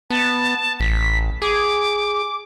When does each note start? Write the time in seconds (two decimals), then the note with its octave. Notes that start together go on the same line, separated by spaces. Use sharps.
0.10 B3 A5
0.80 A1 B6
1.42 G#4 D6